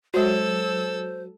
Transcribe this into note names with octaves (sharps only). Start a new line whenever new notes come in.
F#3 G#3 F#4 A4 C5 E6